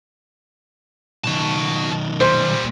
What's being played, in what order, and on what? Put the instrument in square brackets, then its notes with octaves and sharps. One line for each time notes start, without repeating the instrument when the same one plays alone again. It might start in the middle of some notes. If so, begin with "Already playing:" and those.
[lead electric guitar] B1 D#3 [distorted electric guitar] F#4 A5
[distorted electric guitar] A#2 G3 [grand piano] C5 C6